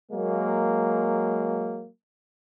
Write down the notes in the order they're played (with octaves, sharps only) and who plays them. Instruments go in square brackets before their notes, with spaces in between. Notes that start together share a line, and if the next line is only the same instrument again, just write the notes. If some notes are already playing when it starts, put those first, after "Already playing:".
[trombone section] F#3 G#3 A#3